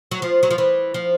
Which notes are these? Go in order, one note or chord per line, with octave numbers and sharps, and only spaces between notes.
F#3
F3
F#3
F3
E3
F3